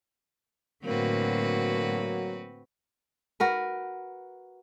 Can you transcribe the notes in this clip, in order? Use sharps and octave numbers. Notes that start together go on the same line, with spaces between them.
A2 D3 F#3 A#3 C4 F#4 B4
F#4 A#4 B4